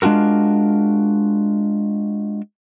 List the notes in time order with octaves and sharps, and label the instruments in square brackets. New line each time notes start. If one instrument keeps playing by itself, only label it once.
[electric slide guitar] G#3 D4 F4 F#4 A#4